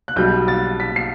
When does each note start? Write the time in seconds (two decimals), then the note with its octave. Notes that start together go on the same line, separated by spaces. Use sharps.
0.08 F#6
0.16 B1 B2 G3 G6
0.48 A6
0.80 B6
0.96 C7